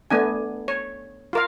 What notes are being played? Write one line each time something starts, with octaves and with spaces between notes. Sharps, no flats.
A3 B3 D4 G#5
C#5
F4 A#4 F5